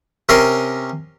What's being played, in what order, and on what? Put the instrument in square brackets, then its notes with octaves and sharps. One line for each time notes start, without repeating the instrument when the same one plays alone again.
[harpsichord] C3 C#4 A#4 D#5 C6